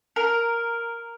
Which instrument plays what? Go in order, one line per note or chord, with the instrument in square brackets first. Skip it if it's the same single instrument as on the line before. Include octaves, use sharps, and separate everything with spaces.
[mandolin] A#4